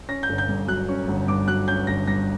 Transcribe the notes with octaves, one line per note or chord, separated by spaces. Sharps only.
C#4 A#6
G6
G1
G6
G2
F#3 F#6
C#4
G1
G2 D6
F#3 F#6
C#4 G6
G1 A#6
G2 A#6